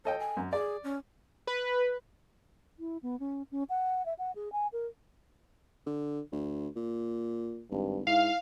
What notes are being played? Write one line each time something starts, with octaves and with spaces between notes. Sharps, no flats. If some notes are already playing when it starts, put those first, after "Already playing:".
A4 C#5 D#5 G5
G#5
F#2
G#4 D5
C#4
B4
E4
B3
C#4
C#4
F#5
E5
F#5
G#4
G#5
A#4
D3
D2
A#2
G#1 G2
G#2 E4 F5